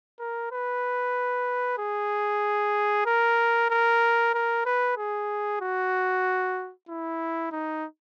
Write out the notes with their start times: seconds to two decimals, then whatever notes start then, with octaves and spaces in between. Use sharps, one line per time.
0.19 A#4
0.52 B4
1.78 G#4
3.06 A#4
3.70 A#4
4.34 A#4
4.66 B4
4.98 G#4
5.61 F#4
6.89 E4
7.52 D#4